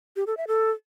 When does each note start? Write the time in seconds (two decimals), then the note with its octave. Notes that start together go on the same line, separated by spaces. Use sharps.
0.16 G4
0.27 A4
0.37 E5
0.48 A4